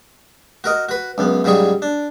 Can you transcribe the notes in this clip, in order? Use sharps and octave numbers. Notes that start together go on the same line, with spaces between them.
F#4 A#4 D#5
F#4 B4
C#2 F#2 B3
G#2 C#3 F#3 G3 G#4 C#6
D4